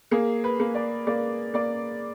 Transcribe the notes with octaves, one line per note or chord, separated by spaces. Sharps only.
A#3 G#4
B4
A#3
D5
A#3 D5
A#3 D5